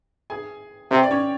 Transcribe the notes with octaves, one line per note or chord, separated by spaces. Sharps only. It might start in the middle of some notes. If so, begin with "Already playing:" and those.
G#4 G#5
C3 G4 G5
D5
C#4 C#5